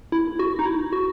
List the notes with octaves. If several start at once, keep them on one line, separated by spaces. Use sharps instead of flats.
E4
F#4
D#4
E4
F#4